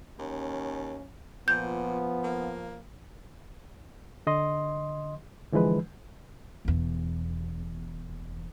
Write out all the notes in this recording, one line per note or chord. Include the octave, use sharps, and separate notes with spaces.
D#2 C#4
A#2 F3 B3 G6
A#3
D3 D#5 C6
D3 E3 F3 G#3 B4
E1 E2